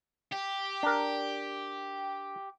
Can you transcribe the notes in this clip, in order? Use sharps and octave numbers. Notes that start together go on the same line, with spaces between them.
G4
D4 A#4